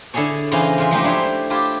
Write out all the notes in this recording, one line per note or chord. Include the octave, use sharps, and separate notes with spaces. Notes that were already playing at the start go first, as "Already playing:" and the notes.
D3 E4 G#4 A4 C#5
C#3 E3 B3 C#4 C5 D#5
G#3 F4 E5
F3 G#3 A3 D#4 G4
D4 E4 C5 C#5
E4 F4 G4 A5